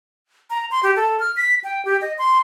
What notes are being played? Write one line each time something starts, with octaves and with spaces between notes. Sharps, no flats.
A#5
C6
G4
A4
F6
B6
G5
G4
D#5
C6